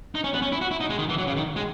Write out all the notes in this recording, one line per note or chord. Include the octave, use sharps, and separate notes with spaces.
D#4
C#4
B3
C#4
E4
F#4
E4
D#4
G#3
D#3
E3
F#3
C#3
D#3
G#3